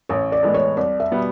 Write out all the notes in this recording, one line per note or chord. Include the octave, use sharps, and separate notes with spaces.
A1 C#5
D5
A2 E3 G#3 B3
C#5
C2 D5
E5
B2 G3 B3